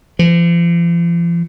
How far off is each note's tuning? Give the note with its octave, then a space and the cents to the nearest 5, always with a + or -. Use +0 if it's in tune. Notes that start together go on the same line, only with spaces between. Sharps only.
F3 -40